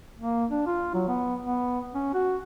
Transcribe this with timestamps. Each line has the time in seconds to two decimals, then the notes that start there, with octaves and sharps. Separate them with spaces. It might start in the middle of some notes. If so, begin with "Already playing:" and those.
0.18 A#3
0.51 D4
0.66 F4
0.94 F#3
1.08 B3
1.41 B3
1.94 C#4
2.13 F#4